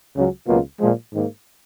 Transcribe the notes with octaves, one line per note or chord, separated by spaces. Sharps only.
C#2 C#3 F#3 C#4
C#2 B2 F#3 A#3 F4
A#2 F3 G#3
G#2 D#3 A#3